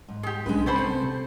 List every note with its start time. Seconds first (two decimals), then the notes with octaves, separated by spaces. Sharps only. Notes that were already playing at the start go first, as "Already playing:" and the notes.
0.09 G#2
0.23 G4 G#4
0.46 B1 G#3 C#4 D4 B4
0.66 C3 C4 C#4 A4 C5 B5
0.78 C5